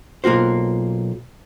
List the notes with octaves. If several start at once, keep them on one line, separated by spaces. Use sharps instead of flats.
B1 A#3 F4 F#4 C5